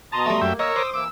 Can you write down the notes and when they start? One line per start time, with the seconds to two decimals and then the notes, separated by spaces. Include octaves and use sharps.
0.12 B2 A5 A#5 C6 D#6
0.26 G3 A3
0.41 F#2 A#3 E5 G5
0.59 A#4 C#5 D#5 E6
0.76 C5 D6 D#6
0.94 E3 A#3 D6 E6